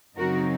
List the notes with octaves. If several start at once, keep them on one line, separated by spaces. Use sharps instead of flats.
F#2 C#3 F#3 C4 D#4 F#4 A#4